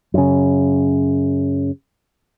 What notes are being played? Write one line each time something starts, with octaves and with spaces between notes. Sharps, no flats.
F#2 C#3